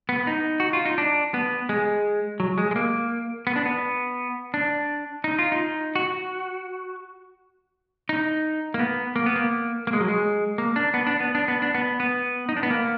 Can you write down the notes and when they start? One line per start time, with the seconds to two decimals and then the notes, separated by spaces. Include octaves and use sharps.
0.09 B3
0.27 D#4
0.60 F#4
0.73 F4
0.86 D#4
0.98 D4
1.34 B3
1.69 G#3
2.40 F#3
2.58 G#3
2.71 G#3
2.76 A#3
3.47 B3
3.56 D4
3.66 B3
4.54 D4
5.24 D#4
5.39 F4
5.52 D#4
5.95 F#4
8.09 D#4
8.74 A#3
8.79 B3
9.16 A#3
9.26 B3
9.36 A#3
9.87 A#3
9.93 G#3
10.00 F#3
10.08 G#3
10.58 A#3
10.76 D4
10.94 B3
11.07 D4
11.20 B3
11.35 D4
11.48 B3
11.62 D4
11.75 B3
12.00 B3
12.49 D#4
12.57 D4
12.63 B3
12.70 A#3